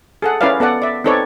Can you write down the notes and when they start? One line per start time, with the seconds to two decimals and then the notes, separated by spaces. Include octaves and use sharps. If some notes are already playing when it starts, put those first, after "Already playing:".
0.22 G#4 A4 F#5
0.41 C#4 E4 A#4 B4 D5 F5
0.60 B3 A4 D5 F#5
0.82 D5 E5
1.04 C4 D#4 A4 B4 C#5 D5